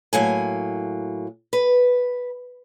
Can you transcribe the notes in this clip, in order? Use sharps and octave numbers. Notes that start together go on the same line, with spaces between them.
A2 F#3 A#3 G#5
B4